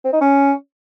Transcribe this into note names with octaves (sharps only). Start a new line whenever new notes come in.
C4
D#4
C#4